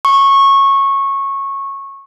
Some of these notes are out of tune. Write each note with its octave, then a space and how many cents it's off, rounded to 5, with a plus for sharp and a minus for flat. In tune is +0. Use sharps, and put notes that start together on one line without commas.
C#6 -15